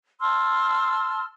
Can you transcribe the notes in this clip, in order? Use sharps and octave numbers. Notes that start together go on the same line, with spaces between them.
A5 C6 E6 F6